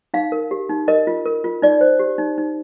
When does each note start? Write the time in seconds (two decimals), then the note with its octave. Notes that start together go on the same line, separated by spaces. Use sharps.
0.14 D#4 F5
0.32 A#4
0.51 G4
0.69 D#4
0.88 A#4 D#5
1.07 F4
1.26 A#4
1.44 F4
1.62 D#4 D5
1.81 C5
1.99 G4
2.18 D#4
2.38 D#4